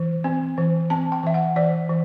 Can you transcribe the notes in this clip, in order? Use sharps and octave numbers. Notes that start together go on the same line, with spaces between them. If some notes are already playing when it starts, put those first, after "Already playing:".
Already playing: E3
C4
E3
C4 A5
G5
E3 E5
F#5
E3 D5
E3